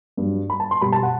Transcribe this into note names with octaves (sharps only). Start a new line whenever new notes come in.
G2 F#3
B5
A5
C6
B2 G3 B5
A5
F#5